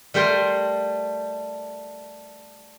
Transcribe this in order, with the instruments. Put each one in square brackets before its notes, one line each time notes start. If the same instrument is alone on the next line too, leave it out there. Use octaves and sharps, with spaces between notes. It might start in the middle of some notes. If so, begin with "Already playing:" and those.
[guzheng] G3 A3 A#4 G5 C6